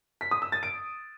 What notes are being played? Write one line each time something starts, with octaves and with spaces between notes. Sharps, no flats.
B6
D#6
E6
A6
D7